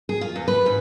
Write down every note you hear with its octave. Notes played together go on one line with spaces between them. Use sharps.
G#4
F4
E2
B4
G#2